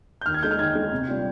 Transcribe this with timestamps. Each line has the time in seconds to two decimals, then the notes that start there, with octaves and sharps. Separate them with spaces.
0.21 G6
0.26 D#2 F6
0.34 G#6
0.43 D#3 G#3 D#4 G6
0.51 F6
0.59 D#2 G#6
0.75 D#3 G#3 D#4
0.92 C3
1.07 G3 D4 F4